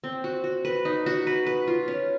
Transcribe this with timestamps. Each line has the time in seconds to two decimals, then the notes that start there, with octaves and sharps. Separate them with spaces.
0.04 C4
0.24 F#4
0.44 F#4
0.65 B4
0.85 D#4
1.06 F#4
1.27 B4
1.47 B4
1.67 F4
1.88 C#4